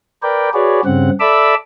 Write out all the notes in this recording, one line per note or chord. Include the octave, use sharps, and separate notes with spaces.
A#4 B4 D5 G5
F#4 G#4 B4 C#5 D5
G2 C#3 C4 F#5
A4 D5 E5 B5 D6 E6